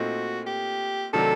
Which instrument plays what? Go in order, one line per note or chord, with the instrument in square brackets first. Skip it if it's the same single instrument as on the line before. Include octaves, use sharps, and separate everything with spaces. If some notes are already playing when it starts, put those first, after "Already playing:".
Already playing: [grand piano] A#2 A3 C4 D#4 [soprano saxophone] F#4
[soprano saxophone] G4
[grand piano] C3 D#3 F#3 A3 D4 [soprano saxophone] A4